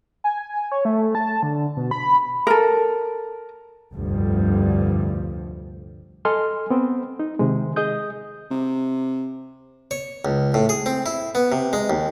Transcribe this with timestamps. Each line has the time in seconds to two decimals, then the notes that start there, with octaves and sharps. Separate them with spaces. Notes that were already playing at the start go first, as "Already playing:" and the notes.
0.24 G#5
0.72 C#5
0.85 A3
1.15 A5
1.43 D3
1.77 B2
1.91 B5
2.47 A4 A#4
3.93 F1 D2 G2 F3 G3
6.25 A4 D#5 G#5 C6 F6
6.70 B3 C4
7.19 D#4
7.39 C3 D#3 G#3
7.76 G#4 D#5 D#6 G6
8.51 C3
9.91 C#5
10.25 C#2
10.54 A2
10.69 G#4
10.86 C4
11.06 E4
11.35 B3
11.52 C3
11.73 G#3
11.90 D#2